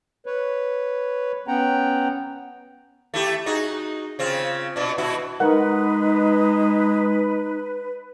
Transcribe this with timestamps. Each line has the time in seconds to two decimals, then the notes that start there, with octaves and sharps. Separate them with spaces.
0.26 B4 C#5
1.48 B3 C#4 F#5 G5 A#5
3.14 A3 E4 G4
3.46 D#4 F#4 G#4
4.19 C#3 C4 F4
4.76 B2 D4
4.98 B2 E4 F#4
5.40 G#3 D#4 A#4 B4 F#5